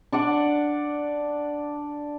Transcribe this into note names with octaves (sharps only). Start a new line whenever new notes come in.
D4 D5 F#5